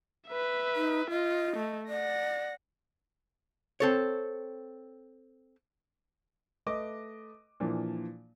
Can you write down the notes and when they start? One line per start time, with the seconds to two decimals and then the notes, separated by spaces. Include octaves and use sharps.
0.28 B4 E5
0.76 D#4
1.11 F4 D#5
1.56 A3
1.88 D5 F#5 A#6
3.80 C4 A4 C#5
6.66 A3 B4 D#5 D6
7.60 A#2 E3 F3 A#3 D4